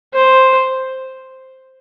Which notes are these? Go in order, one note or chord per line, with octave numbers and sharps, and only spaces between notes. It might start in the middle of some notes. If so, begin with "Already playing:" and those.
C5